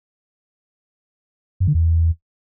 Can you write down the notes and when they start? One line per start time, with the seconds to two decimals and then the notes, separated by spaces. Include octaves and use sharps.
1.60 F#2
1.67 D3
1.74 E2